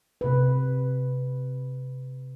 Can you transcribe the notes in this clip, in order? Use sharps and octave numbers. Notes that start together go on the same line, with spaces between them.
C3 B4